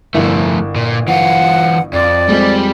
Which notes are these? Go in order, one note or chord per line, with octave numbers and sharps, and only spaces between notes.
G1 F3 A3 E4 A#4
A#2
E3 F4 F#5
F2 D5
F2 G3 G#3 C4